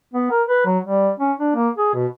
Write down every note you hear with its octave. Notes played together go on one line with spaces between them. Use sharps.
B3
A#4
B4
F#3
G3
C#4
D4
A#3
G#4
B2